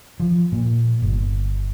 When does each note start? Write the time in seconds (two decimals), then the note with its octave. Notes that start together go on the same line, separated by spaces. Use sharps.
0.20 F3
0.52 A#2
1.02 G1